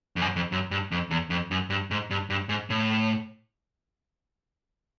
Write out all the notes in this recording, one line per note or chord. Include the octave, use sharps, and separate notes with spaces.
F2
F#2
F2
F#2
G2
F2
E2
F2
F#2
G2
G#2
G2
G2
G#2
A2